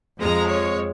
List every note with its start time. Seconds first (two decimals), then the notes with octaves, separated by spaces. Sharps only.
0.20 F2 F3 G#3 A#5
0.48 C#5